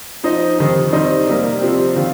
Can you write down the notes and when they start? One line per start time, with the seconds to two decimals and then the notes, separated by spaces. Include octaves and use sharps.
0.24 F3 D#4 C5 D#5
0.59 F2 C3 D#3
0.93 G3 C4 D#4 C5 D#5
1.27 C3 G3 A#3
1.61 C3 F3 C4
1.96 D#3 C4 F4